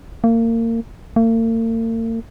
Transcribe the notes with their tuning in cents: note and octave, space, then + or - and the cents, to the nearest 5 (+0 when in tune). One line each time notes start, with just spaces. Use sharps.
A#3 -30
A#3 -45